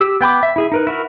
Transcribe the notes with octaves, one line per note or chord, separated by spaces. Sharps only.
G4 E6
B3 G5 B5 D6
E5
E4 G#4 E5
D#4 A#4 B4
E4 F#4 A#4